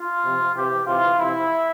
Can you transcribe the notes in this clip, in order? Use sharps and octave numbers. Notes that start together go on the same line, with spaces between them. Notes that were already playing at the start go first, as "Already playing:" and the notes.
Already playing: F4
C3 F3
C3 E3 G4
C3 E3 F4
C3 F3 E4